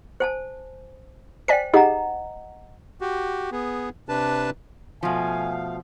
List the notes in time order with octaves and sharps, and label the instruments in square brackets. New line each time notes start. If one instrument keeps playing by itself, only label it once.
[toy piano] C5 G#5 A5
[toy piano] C5 G5 [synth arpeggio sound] D5 G#5 B6
[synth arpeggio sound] D#4 G4 G#4 [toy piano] D#5 F#5 A#5
[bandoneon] F#4 G4
B3 G#4
C3 D4 B4 A5
[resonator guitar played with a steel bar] B2 F3 [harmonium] A3 F5 [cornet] G#5